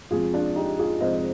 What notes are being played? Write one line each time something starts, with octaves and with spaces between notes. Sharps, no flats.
F2 C3 F3 G#3 F4 G#4
D4 F4
D#4 G4
F4 G#4
F2 C3 F3 G#3 C5 D#5